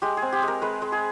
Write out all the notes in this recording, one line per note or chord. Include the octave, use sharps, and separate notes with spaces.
G#3 G4
G#4
C4
G4
G#3
A#4
G#3 B4
G#3
G#4